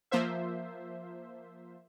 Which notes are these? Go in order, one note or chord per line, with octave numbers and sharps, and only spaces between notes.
F3 A#3 F4 C5 E5